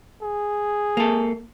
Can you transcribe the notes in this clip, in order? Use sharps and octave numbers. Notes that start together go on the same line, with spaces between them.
G#4
A#3 A4